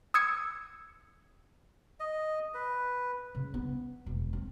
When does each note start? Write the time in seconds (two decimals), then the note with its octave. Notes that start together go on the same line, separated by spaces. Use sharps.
0.14 D#6 E6 G#6 C#7
2.00 D#5
2.54 B4
3.35 C#3
3.54 B3
4.06 E1
4.33 C4